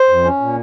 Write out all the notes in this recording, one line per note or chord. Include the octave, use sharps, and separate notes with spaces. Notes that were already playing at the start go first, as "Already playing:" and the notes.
Already playing: C5
F2
C#4
A#2